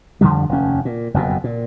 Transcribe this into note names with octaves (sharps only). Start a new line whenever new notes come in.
F2 D3 F3 G3
F1 D#2 C#4
A#2
F#1 F2 G#2 B2
A#2